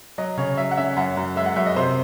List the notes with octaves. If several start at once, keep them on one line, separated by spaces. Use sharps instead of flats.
F#3 D#5
C#3 C#5
F#3 E5
F#5
C#4 E5
F#2 F#5
F#2
G#3 E5
F#5
F#2 E5
D#5
C3 C5